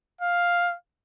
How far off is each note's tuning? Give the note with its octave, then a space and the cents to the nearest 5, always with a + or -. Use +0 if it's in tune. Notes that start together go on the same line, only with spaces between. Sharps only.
F5 +5